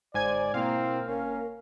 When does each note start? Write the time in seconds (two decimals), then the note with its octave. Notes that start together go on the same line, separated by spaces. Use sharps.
0.14 G1 G#2 C5 D5 G#5 G#6
0.54 B2 A#3 C4 E4 F5
1.08 E1 C#4 A#4